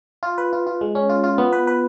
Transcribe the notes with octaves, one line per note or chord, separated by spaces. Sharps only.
F4
B4
F4
F4
G#3
C#4
F4
F4
B3
B4
B4